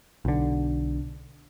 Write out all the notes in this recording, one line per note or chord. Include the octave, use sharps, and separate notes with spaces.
B1 D3